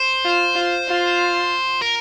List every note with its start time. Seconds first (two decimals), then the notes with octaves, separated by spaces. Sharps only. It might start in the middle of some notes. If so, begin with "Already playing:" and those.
Already playing: C5
0.25 F4
0.55 F4
0.88 F4
1.82 A#4